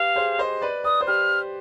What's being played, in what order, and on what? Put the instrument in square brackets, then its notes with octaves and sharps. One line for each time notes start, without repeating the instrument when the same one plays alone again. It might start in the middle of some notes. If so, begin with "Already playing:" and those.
Already playing: [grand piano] G4 B4 [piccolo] F5
[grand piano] G#4 C5
C5 D#5
B4 D5
[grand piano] B4 D5 [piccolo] D#6
[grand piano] C5
[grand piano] G4 B4 [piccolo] F6